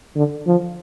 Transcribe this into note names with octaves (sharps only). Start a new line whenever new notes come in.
D3
F3